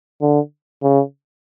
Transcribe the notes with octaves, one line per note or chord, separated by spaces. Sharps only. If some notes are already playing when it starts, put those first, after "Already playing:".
D3
C#3